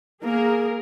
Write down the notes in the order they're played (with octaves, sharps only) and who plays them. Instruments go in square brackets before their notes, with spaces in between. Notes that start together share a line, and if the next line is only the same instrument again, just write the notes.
[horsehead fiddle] A#3 [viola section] G#4 A#4